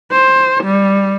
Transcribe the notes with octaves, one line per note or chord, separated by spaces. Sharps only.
C5
G3